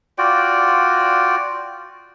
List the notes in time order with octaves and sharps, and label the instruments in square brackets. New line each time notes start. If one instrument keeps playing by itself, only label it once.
[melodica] F4 F#4 D5 G5